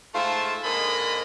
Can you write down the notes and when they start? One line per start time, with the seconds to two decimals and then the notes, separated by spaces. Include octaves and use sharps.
0.14 G#2 A3 F4 C5 E5 A5
0.63 G#2 D3 A#3 C5 D#5 B5